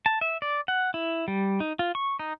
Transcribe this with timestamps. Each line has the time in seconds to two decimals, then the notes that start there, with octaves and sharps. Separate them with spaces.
0.06 A5
0.21 E5
0.42 D5
0.68 F#5
0.94 E4
1.28 G3
1.60 D#4
1.79 F4
1.95 C#6
2.19 D#4